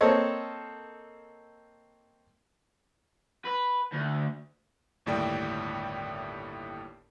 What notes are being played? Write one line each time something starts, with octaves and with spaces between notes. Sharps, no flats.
A#3 C4 A4 C#5 D#5
B4
D2
G1 D#2 A2 G3 D5 G5